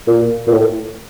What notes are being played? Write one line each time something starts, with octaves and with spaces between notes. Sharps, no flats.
A#2
A#2
A2